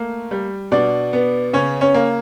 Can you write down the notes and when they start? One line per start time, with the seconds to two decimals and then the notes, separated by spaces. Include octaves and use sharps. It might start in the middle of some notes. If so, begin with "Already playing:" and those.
Already playing: A3 A#3
0.31 G3
0.72 B2 D4 D5
1.13 B3
1.53 C#3 C#4 C#5
1.81 C#4 C#5
1.94 A#3